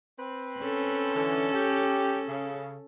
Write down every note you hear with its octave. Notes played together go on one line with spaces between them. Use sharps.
C4 B4
C#4 A4
D3 E3
G4
C#3